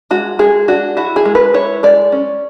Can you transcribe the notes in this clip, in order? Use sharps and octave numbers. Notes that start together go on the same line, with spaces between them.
G#3 F#4
G#3 G#4
D4 F#4
E4 F#4
G#4
G#3
B4
E4 C#5
G#3 D5
C#4